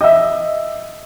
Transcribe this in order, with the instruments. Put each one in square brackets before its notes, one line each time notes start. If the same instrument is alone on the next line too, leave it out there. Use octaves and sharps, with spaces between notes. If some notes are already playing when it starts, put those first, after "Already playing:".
[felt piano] D#5 E5